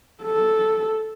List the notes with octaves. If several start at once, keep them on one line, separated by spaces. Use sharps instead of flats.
A4